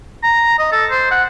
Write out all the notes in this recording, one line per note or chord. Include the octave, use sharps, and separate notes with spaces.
A#5
D#5
A4
C5
F#5